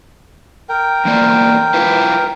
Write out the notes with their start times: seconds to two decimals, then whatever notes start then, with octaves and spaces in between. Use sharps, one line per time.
0.69 A#4 G5
1.05 E2 A#3 D5
1.74 E4 F4 B4